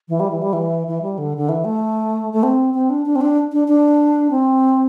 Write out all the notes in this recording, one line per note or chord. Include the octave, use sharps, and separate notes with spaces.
E3
G3
E3
G3
E3
E3
G3
D3
D3
E3
A3
A3
C4
C4
D4
D4
C4
D4
D4
D4
C4